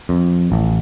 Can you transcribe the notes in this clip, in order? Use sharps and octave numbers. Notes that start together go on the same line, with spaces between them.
F2
A1